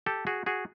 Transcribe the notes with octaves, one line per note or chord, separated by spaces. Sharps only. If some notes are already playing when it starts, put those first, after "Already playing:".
G4 A4
F#4 G#4
F#4 G#4